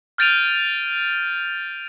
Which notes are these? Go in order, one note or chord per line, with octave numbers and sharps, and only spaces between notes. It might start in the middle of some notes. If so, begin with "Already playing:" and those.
F6 G6 A6 D7 D#7 F7